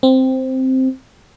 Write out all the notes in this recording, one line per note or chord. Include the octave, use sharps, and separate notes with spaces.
C4